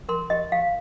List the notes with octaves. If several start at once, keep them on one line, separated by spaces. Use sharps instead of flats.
A#4 C6
G4 D#5
G4 F5